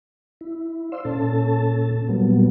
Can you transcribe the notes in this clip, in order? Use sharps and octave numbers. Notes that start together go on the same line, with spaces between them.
E4
C5 D5 F5 C6 E6
A#2 C#4 A4 A5
A#2 F#3 G3 A#3 B3